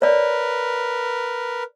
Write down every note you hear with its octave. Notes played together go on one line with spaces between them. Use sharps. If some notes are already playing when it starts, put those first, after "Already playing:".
A#4 B4 C#5 D5